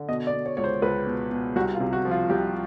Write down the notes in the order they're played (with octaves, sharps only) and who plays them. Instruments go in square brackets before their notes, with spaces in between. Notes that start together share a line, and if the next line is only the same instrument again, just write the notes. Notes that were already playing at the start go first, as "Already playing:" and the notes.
Already playing: [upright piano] D3
B2 D#5
D5
B2
C#5
C#2 C#5
C5
C#2 B4
B2
B2
C2 F#4
F4
C3
F#4
F3
F4
C2 G4